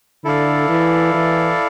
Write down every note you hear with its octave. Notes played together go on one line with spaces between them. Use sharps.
D3 E4 A4 D5 F5
E3
E3